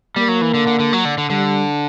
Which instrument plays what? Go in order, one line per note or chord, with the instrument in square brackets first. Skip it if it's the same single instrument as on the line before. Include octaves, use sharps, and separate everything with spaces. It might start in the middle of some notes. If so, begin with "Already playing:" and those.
[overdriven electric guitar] G3 [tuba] A#3
[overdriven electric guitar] F#3
E3
D3
D3
D3
F#3
D3
D3
[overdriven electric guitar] D3 [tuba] G3